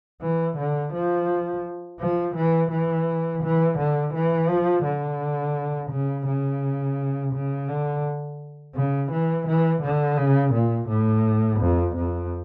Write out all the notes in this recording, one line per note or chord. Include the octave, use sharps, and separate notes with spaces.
E3
D3
F3
F3
E3
E3
E3
D3
E3
F3
D3
C#3
C#3
C#3
D3
C#3
E3
E3
D3
C#3
A#2
A2
F2
F2